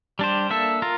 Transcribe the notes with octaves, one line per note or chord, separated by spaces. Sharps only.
G3 D4 G4 C5
A#3 D4 A4 E5
F4 A#4